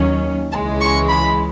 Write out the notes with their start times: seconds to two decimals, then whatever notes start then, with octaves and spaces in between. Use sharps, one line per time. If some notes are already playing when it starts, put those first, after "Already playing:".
Already playing: D#2 D#3 F#3 C#4
0.52 C#2 C#3 E3 G#3 A5
0.81 C#6
1.10 B5